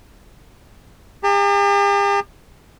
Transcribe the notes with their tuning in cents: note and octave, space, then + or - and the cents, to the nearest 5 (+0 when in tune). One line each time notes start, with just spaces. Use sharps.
G4 +45 A5 +45